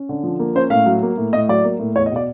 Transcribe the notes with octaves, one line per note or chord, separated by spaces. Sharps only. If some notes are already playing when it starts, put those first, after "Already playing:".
Already playing: C#4
D3
F3
A#3
C#4 C5
A2 F5
F#3
A#3
A2
A2 D#5
F#3 D5
A#3
A2
E2 C#5
D#5
B2 D5